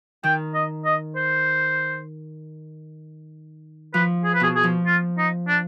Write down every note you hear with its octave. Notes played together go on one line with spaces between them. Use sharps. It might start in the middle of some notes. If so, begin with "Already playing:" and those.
D#3 G5
D#5
D#5
C5
F3 B4
G#4
B4
B2 G#4
G#4
F3
F4
D#4
D4